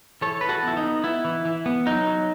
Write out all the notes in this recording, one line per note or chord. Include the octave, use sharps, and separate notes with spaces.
E3 A4 C#5
E3 B4
F#4 A4
B3 E4
D#4
B3
B3 E4
E3
E3
B3
F#3 D#4
F#3